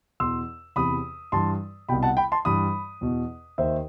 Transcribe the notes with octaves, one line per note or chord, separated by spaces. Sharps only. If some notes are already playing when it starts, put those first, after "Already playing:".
E2 B2 C6 E6
E2 C3 E3 B5 D#6
G2 E3 A5 C6
C2 B2 G5 B5
F#5 A5
G5 B5
A5 C6
G2 E3 B5 D#6
E2 B2
D#2 D#3 C5 E5